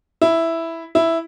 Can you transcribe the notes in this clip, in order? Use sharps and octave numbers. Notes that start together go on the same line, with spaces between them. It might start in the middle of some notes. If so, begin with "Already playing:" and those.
E4
E4